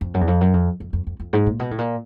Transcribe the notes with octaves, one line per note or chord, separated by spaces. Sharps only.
F2
F#2
E2
F2
F#2
F2
F2
F2
F2
F2
G#2
A#2
B2
A2
A#2